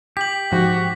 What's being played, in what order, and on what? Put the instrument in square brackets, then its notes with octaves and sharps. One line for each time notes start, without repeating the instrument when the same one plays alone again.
[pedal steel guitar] G4 [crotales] B6 F#7
[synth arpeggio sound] G#2 F3 [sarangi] F#4